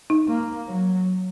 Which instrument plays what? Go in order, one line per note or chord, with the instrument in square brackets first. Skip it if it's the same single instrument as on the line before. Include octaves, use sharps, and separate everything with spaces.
[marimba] D#4
[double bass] A#3
F#3